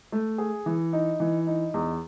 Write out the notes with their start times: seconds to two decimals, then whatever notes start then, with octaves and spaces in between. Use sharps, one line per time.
0.12 A3
0.38 G#4
0.66 E3
0.93 D#4
1.20 E3
1.47 D#4
1.74 E2